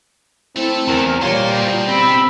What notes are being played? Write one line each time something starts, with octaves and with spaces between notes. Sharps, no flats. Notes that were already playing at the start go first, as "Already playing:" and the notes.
A3 C4 E4 A4
E2 A#4
G3 A#3 F4 C5 C#5
B2 C5
C4 B5 E6